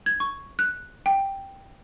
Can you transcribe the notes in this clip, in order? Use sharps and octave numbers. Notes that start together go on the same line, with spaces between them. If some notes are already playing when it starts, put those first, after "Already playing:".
G#6
C#6
F#6
G5